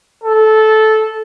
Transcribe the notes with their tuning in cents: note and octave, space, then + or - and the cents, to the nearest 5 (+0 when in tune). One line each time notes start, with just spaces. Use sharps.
A4 -15